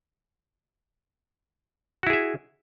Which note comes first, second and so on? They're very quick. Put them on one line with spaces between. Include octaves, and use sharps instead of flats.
F#4 E4 G#4 E5